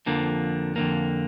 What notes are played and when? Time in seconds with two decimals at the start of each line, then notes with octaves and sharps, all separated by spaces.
0.06 F2 D3 F3 A#3
0.76 F2 D3 F3 A#3